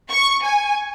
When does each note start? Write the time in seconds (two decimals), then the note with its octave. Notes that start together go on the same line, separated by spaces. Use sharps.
0.10 C#6
0.44 G#5